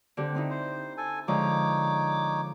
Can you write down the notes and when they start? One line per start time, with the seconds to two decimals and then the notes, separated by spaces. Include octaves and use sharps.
0.17 D3 C4 G4
0.35 C4 D#4 E4
0.51 C5
0.98 A4 G#5
1.28 D3 F3 G#3 D#4 C#5 D6